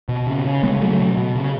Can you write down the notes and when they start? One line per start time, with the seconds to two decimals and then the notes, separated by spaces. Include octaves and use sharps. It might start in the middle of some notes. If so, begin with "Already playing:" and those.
0.09 B2
0.27 C#3
0.45 C#3
0.63 C#3 G#3 B3
0.81 C#3 F#3 A3
0.99 B2
1.17 B2
1.35 C#3